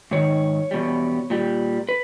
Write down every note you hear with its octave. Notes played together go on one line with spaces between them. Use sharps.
G#2 D#3 C#5
E2 B2 G3
A#2 G3
B4